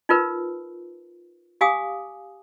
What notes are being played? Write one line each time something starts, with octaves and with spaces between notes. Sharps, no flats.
D#4 F4 A#4 B4
G4 F5 G#5 D6 D#6